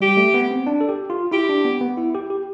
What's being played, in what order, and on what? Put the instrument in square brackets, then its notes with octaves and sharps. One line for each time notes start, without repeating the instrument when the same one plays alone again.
[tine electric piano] G3 [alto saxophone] G4
[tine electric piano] A3
B3
C4
D4
A4
G4
F4
[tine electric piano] E4 [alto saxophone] G4
[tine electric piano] D4
B3
B3
E4
G4
G4